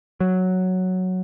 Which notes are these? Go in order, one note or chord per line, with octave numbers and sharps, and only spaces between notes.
F#3